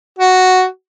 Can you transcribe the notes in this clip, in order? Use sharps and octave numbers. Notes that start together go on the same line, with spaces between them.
F#4